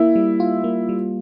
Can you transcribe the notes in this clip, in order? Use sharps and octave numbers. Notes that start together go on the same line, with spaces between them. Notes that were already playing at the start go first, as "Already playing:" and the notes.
Already playing: A#3 E4
G3
F4
A#3
G3